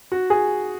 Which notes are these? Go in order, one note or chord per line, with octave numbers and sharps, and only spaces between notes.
F#4
G#4